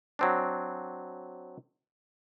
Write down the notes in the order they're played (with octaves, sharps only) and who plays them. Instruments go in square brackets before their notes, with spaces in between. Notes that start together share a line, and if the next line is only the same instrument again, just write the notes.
[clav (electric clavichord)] F#3 C4 D4